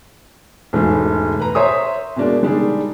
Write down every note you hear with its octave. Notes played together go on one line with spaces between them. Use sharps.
E1 G#2 A3 G#4
B4 A#5
C5 C#5 E5 A#5 C6 D#6
B2 G#3 A#3 D4
D3 G3 G#3 D4 D#4 G#4